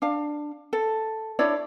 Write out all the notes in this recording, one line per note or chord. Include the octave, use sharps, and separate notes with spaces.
D4 F5
A4
D4 E4 C#5 D5